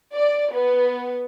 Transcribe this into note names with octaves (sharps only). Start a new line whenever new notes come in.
D5
B3